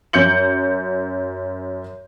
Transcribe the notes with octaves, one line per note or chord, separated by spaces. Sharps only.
F#2 G6 C#7 F#7